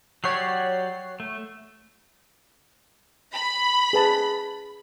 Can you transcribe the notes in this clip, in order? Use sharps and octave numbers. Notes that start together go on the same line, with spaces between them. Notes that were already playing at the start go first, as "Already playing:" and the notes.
F#3 G4 C#5 D5 F#5 C7
A3
B5
G#4 B4 A5